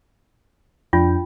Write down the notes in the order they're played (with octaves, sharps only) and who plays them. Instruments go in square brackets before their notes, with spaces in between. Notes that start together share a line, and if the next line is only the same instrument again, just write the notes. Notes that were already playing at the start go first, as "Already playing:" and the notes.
[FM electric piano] F2 D4 G5 [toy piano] F4